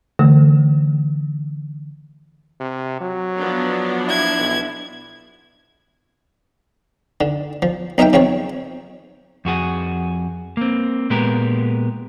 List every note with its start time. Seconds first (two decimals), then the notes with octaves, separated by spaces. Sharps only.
0.19 D3 E3 A3
2.60 C3
3.01 F#3
3.39 F3 B3 D4
4.07 E4 G#6
4.40 B1
7.21 D3
7.62 F3
7.98 B1 D#4 A#4 D#5 E5 G5
8.13 C#3 F3 C4 C#5
9.45 F2 F#4 G#4 F#5
10.57 A#3 C4
11.10 A#2 G#3 B3 G4 A#4